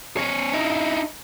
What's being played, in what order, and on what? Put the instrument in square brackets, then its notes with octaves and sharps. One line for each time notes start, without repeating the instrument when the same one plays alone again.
[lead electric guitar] C4 C#5
D#4 E4